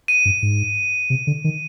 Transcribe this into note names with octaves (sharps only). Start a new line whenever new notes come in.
D#7
G2
G#2
C3
D3
D#3